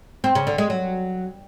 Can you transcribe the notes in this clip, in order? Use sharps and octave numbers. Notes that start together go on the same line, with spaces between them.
C4
C#3
D3
G#3
F#3